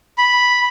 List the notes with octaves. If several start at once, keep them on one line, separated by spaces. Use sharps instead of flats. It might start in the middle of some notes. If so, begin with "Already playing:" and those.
B5